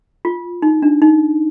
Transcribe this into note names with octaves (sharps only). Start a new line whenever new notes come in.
F4
D#4
D4
D#4